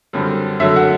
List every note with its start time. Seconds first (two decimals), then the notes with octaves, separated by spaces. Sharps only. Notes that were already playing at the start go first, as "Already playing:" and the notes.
0.13 F#2 D3 G3 C4
0.60 F#2 D3 F#3 A3 E5
0.76 F#5